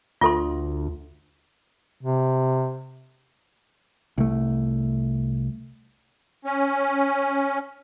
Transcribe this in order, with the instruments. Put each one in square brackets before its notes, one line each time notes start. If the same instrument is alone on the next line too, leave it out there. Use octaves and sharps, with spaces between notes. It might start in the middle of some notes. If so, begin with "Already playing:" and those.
[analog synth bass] D2 [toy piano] F4 A4 C6
[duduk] C3
[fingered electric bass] C2 A3
[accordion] C#4